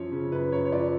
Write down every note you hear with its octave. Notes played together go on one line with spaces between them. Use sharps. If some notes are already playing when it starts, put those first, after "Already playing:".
Already playing: F#2 F3 C#5
C#3
F#2 B4
F#2 C#5
C#5
F3 D5